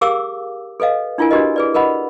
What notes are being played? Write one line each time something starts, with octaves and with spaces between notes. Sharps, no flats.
G4 G#4 A#4 F5 D6 E6
A4 B4 D#5 F5
D4 E4 F4 A#4 G#5
D4 F#4 G4 A#4 B4 D#5
G#4 B4 D5
A#4 B4 D#5 F#5 B5